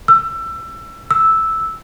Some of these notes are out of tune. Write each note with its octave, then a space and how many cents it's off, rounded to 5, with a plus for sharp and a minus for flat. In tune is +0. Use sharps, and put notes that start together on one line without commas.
E6 +25
E6 -5